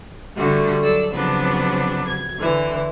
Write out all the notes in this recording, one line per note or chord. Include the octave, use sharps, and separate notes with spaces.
D3 G3 A3 F#4
F#3 A4 D5 E6
C#3 F3 F#3 B3 C4 D4
G#6
D3 E3 E4